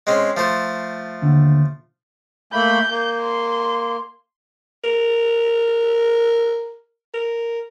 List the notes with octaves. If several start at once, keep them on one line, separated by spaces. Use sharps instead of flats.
G#3 C4 C#4
F3 A3 C5
D#2 D3
A3 A#3 B5 G6
A#3
C6
A#4
A#4